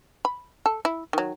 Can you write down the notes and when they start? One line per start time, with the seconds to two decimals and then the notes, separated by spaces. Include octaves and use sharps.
0.25 B5
0.66 A4
0.85 E4
1.13 D#3 F#3